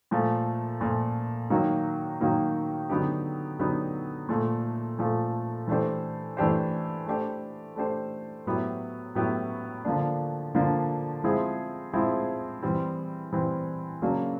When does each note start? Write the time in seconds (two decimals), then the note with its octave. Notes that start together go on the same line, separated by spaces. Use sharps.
0.11 A#2 F3 A3
0.81 A#2 F3 A3
1.50 D#3 F#3 A#3 D#4
2.20 D#3 F#3 A#3 D#4
2.90 D3 F#3 B3 D#4 G4
3.59 D3 F#3 B3 D#4 G4
4.29 A#2 F3 A3
4.98 A#2 F3 A3
5.68 E3 A3 D4 G4 C5
6.37 E3 A3 D4 G4 C5
7.06 A3 D4 G4 C5
7.76 A3 D4 G4 C5
8.46 A2 F#3 B3 E4 G4
9.15 A2 F#3 B3 E4 G4
9.85 D3 F3 A#3 D4
10.55 D3 F3 A#3 D4
11.24 F3 G#3 C4 E4 G#4
11.93 F3 G#3 C4 E4 G#4
12.63 E3 G3 C4
13.33 E3 G3 C4
14.02 C#3 F#3 A#3 D4